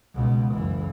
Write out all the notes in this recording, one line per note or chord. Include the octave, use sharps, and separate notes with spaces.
C#2 B2
F#1 E3